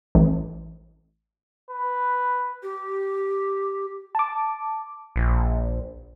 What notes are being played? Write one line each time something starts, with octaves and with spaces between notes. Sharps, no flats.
A1
B4
G4
A5 D6
A#1